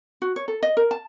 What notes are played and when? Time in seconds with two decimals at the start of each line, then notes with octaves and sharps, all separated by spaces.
0.22 F#4
0.36 C#5
0.48 A4
0.63 D#5
0.77 A#4
0.91 A5